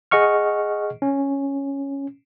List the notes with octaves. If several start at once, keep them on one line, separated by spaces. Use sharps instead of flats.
G#4 D#5 F#5 C#6 F6
C#4